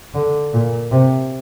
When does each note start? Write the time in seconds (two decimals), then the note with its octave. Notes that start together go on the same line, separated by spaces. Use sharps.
0.15 D3
0.54 A#2
0.92 C3